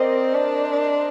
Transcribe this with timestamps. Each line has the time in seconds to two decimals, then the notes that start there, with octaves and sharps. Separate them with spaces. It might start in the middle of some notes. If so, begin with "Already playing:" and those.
Already playing: C4 A#4 C5 D5 D#5
0.34 D4